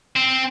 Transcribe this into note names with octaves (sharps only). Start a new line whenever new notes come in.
C4